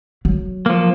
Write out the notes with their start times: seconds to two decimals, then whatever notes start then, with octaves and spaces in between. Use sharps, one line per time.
0.25 F#3
0.66 F3 A#3